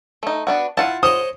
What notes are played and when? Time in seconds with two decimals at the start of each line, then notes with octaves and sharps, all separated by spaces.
0.23 A3 D#4
0.47 B3 D4 F#4
0.77 E4 F4 F#5 A5
1.03 C5 C#5 D#5 D#6